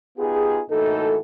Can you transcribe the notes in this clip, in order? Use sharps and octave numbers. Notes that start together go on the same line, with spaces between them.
B3 D#4 F4 G4 G#4
A2 E3 A#3 D#4 F#4 A4